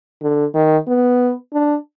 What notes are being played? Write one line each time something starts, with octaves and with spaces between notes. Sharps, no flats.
D3
D#3
B3
D4